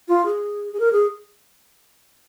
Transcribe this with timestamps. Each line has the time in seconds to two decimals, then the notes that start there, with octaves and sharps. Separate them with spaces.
0.08 F4
0.25 G#4
0.73 G#4
0.80 A#4
0.93 G#4